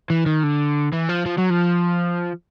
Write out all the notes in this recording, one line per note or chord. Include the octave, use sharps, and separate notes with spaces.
E3
D#3
D3
E3
F3
F3
F#3
F3